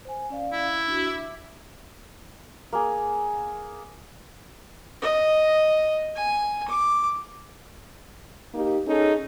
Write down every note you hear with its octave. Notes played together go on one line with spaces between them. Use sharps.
C5 G#5
C#4 D5 F5
E4
D4 F#4
E5 D6
A#3 G#4
D#5
G#5
D6
A#3 D#4 G4
C#4 D#4 G#4 A4